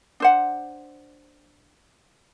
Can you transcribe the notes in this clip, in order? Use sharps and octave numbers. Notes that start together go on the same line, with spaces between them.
D4 C5 F#5